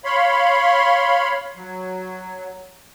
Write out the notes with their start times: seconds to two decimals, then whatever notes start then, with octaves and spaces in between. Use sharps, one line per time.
0.04 C#5 F5 B5 C6
1.56 F#3